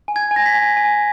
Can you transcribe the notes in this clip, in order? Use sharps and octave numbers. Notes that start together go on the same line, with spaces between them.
G#5
G#6
G#5
A#6
B6
G#5
G#5